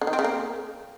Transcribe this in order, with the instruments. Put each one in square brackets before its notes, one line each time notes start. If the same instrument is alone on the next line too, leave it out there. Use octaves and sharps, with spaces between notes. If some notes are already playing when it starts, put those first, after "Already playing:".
[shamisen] D3
D#3
C4
C#3
A#3